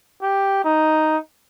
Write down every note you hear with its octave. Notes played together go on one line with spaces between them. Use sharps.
G4
D#4